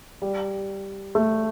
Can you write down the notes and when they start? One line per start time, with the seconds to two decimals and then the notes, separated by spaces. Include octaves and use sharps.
0.22 G3
1.15 A3